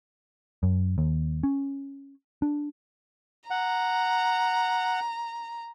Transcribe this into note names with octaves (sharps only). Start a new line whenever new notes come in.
F#2
D#2
C#4
D4
F#5 A#5